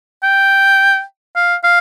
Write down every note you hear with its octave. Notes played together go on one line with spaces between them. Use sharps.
G5
F5
F5